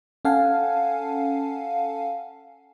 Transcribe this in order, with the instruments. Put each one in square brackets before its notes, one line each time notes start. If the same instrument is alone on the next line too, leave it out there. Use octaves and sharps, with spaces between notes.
[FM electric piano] C#4 A4 F5 F#5 G#5 A5